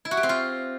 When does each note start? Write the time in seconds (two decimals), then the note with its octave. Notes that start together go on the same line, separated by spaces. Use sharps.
0.05 E4
0.11 F#4
0.17 G4
0.23 C4
0.29 F4